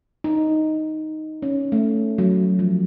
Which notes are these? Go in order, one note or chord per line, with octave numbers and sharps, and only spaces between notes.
D#4
C#4
A3
F#3
F3